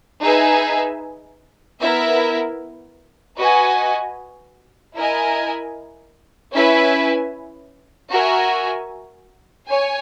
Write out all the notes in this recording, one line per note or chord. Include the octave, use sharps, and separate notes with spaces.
D#4 G#4 B4 E5 G#5
B3 E4 A#4 E5
F#4 B4 D#5 G#5
E4 A#4 D#5 G#5
C#4 E4 B4 E5 G#5
F#4 A#4 E5 G#5
C#5 G#5